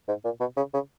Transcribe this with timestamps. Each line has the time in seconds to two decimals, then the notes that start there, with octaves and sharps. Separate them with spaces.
0.08 G#2
0.24 A#2
0.40 B2
0.57 C#3
0.74 C#3